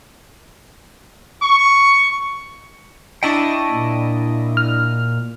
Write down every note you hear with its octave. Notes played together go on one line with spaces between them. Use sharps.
C#6
D4 E4 D#5 G5 A5 C#6
A#2
F6